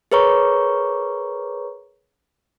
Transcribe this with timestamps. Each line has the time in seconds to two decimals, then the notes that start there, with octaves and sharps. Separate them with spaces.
0.12 G#4 A#4 B4 C#5 A#5 C#6